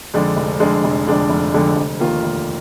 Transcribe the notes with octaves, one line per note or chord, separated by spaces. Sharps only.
F2 D3 G#3 D4
F1
F2 D3 G#3 D4
F1
F2 D3 G#3 D4
F1
F2 D3 G#3 D4
F1
D#2 D#3 A#3 F4
F1